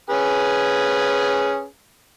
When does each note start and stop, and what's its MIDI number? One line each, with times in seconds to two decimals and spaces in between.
0.10 1.65 61
0.10 1.65 68
0.10 1.65 71